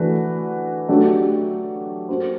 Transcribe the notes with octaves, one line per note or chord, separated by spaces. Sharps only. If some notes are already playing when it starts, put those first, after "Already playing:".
Already playing: E3 A3 D4 F#4 B4
F#3 A3 D4 G4
A#3 C#4 F#4 A4 C5